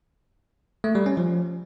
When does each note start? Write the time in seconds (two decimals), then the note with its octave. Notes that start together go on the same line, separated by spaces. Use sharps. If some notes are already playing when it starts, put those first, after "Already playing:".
0.84 A3
0.95 G3
1.06 C#4
1.17 F3